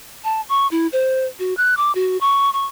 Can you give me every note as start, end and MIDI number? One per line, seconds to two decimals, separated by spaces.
0.24 0.41 81
0.49 0.67 85
0.71 0.87 64
0.93 1.26 72
1.39 1.56 66
1.57 1.75 90
1.77 1.92 86
1.95 2.18 66
2.21 2.52 85
2.53 2.66 85